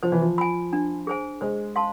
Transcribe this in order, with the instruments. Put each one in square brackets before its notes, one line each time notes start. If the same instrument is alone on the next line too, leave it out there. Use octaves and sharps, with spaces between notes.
[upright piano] F3 [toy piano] C5
[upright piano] E3
F3
[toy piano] G#5 B5
D4
G#4 C5 G#5
[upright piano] G#3 [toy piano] C5
[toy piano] F5 A5 C6